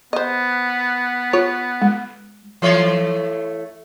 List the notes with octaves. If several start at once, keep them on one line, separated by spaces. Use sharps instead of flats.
B3 C5 D#5
F4 C#5
G#3
E3 A3 C#5